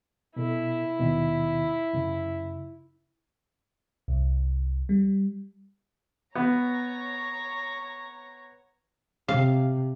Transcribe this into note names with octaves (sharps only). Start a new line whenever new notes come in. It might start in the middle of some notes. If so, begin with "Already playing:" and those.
B2 E4 A4
D#2 B2 D#3
F#2 C#3
C2
G3
B3 C#5 A#5
C3 F5